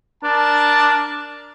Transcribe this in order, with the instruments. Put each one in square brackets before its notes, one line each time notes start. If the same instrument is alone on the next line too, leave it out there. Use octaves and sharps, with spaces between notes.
[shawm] D4 [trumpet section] A#4 A5